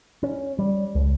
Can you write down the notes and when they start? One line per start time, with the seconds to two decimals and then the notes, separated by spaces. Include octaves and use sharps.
0.23 C#4
0.59 G3
0.95 C#2